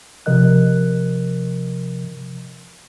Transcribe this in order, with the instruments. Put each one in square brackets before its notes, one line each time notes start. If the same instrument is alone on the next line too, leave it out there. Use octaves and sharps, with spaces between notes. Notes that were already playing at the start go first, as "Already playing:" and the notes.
[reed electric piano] C3 F3 A#4 D#5 F#6